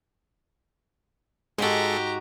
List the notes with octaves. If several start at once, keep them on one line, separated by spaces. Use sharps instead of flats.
G#2 G#3 F#4 G4 A4 A#5